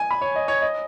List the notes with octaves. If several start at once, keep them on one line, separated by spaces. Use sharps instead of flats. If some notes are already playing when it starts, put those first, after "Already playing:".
Already playing: G#5
B5
C#5
D#5
C#5
D#5